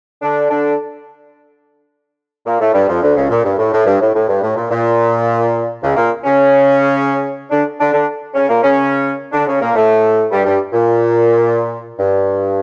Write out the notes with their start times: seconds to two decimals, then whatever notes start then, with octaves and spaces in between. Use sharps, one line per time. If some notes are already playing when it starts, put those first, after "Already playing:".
0.22 D3 D4
0.50 D3 D4
2.46 A#2 A#3
2.60 A2 A3
2.74 G2 G3
2.88 F2 F3
3.02 D2 D3
3.16 C#2 C#3
3.30 A#2
3.45 G2
3.58 A2
3.73 A2
3.86 G2
4.01 A2
4.14 A2
4.29 G2
4.43 A2
4.56 A#2
4.71 A#2
5.83 C#2 C#3
5.96 A#2 A#3
6.24 C#3 C#4
7.51 D3 D4
7.79 D3 D4
7.92 D3 D4
8.34 C#3 C#4
8.49 A#2 A#3
8.63 C#3 C#4
9.33 D3 D4
9.47 C#3 C#4
9.61 A#2 A#3
9.75 A2 A3
10.31 G2 G3
10.46 G2 G3
10.73 A#2
11.99 G2